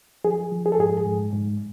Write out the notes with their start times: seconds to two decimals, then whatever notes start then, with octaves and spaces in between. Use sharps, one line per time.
0.24 F3 G#4
0.52 F3
0.66 G#4
0.72 A4
0.79 G#2 G#4
1.06 G#2
1.33 G#2